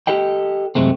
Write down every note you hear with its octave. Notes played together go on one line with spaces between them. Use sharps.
G4 A4 D#5 G5
F#2 C3 G#3 A3 C4